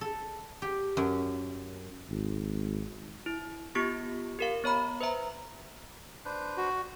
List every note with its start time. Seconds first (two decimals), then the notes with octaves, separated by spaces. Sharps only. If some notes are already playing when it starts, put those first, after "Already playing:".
0.01 A4
0.62 G4
0.97 F#2
2.09 G#1
3.26 E4
3.75 B3 F4 G4 C#6 A#6
4.39 G4 A#4 F5
4.64 B3 C#5 A#5 B5
5.01 B4 C5 E5 A#5
6.25 D4 B4 C5
6.57 F#4